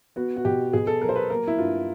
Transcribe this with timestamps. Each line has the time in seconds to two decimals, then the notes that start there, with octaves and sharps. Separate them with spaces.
0.16 B3 F#4
0.36 F#4
0.45 B2 G4
0.73 B2 G#4
0.87 A4
1.02 F#3 A#4
1.09 C5
1.16 B4
1.30 A#3 A#4
1.47 E4
1.59 G2 F4